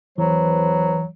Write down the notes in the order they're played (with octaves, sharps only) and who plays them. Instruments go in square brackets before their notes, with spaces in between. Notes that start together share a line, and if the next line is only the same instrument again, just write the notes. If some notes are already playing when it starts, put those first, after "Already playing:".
[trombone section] E2 B4 C5 [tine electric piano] E3 [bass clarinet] F#3